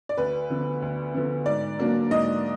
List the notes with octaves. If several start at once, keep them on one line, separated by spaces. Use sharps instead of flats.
D5
D2 B4
D3 F3 B3
D2
D3 F3 B3
G#2 D5
F#3 A#3 D4
G#2 D#5